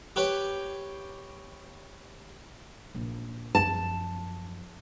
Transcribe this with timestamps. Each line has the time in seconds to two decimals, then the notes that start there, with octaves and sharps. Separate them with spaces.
0.16 G4 B4 C#5
2.95 A#1
3.55 F#2 F3 A5